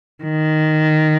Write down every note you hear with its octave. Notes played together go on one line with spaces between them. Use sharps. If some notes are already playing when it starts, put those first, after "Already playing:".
D#3